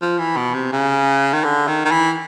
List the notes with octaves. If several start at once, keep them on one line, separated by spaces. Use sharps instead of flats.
F3
E3
B2
C3
C#3
D#3
D3
D#3
D#3
E3